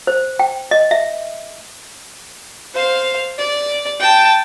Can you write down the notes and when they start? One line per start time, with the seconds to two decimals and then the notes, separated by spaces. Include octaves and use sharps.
0.07 C5
0.39 G5
0.71 D#5
0.91 E5
2.74 C5 F5
3.38 D5
4.00 G5 A5